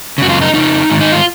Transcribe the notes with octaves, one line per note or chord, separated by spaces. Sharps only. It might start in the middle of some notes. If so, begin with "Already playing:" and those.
F#2 C#3 F#4
F4
D#4
F2 C#3 D#4
G#2 D#3
D#4
F4